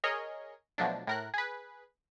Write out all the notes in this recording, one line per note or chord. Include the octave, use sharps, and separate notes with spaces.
G#4 A#4 C#5 D#5
B2 F3 F#3 A3 D4
A2 A#4 F#6
G#4 B4